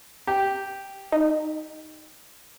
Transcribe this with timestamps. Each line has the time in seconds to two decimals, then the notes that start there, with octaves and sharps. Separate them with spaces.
0.27 G4
1.12 D#4